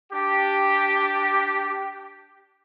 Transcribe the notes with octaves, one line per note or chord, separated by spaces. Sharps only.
D4 G4